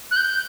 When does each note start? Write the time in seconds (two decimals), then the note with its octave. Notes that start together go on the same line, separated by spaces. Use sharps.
0.11 F#6
0.16 G6